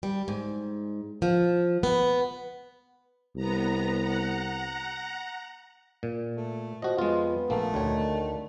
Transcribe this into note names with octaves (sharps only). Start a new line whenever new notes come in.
G3
G#2
F3
B3
C2 B3 A#5
F#5 A#5
A#2
A3
F3 F#4 D#5
F2 G#3 B3 F4
A#1 A3 A#3
D2 D3 D#3 C#5